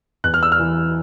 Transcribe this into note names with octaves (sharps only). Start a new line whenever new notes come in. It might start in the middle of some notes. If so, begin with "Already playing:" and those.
E2 F#6
F6
E6
F6
E3